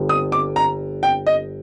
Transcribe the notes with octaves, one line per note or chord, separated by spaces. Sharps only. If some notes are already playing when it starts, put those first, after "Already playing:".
Already playing: G1 G2
D#6
D6
A#5
G5
D#5